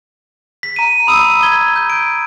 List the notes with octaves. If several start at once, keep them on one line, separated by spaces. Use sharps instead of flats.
B6
A#5 D#7
B5 D#6 E6 D#7
G#6 G7
G6
D7